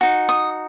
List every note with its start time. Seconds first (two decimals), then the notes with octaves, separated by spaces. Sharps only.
0.01 D#4 F#4
0.29 D#6